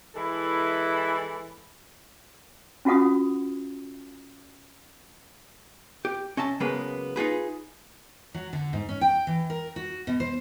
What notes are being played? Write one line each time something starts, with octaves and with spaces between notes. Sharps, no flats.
E3 G#3 E4 A4
C#4 F4 F#4 F#5 D#6
G4
C#4 D#5 E5 A5
C#3 F#3 G#3 A#3 B3 B4
D#4 F4 G#4 B4
F#3
D3
G#2
C#4
G5
E3
A#4
F#4
B2
C5